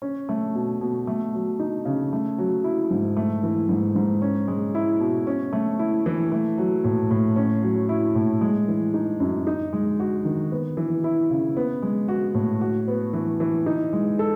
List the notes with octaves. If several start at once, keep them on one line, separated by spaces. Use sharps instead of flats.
C#4
A3
B2
B2
A3
F#3
D#4
C#3
A3
F#3
E4
G#2
A3
E3
G#2
G#2
C#4
G#3
E4
B2
C#4
A3
E4
E3
A3
F#3
A2
A2
C#4
F#3
E4
A2
G#3
E3
D#4
F#2
D#4
G#3
F#4
D#3
B3
E3
E4
C#3
B3
G#3
F#4
A2
F#4
B3
E3
E3
D#4
G#3
A4